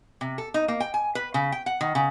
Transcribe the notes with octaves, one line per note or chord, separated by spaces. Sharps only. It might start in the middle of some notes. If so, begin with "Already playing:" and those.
C3
A4
D#4
A#3
G5
G#5
B4
C#3
G5
F#5
D#3
C#3